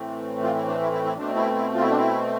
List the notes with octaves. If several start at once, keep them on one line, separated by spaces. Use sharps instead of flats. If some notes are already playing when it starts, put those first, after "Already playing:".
Already playing: A2 E3 A3 C4
F4
E4
D4
E4
E4
E4
B2 A3 C4 D4
E4
E4
F4
E4
D4
E4